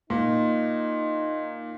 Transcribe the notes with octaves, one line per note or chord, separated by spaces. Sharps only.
A#2 D#4